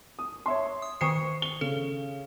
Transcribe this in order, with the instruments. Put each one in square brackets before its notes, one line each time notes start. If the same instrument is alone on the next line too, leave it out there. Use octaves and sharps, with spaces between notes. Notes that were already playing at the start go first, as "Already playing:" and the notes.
[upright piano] D#6
C#5 E5 C6
[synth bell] D#6
[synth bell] D#3 C5 C#7 [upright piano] C#6 D#6 C7
[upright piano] G7
[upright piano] C#3 [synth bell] A4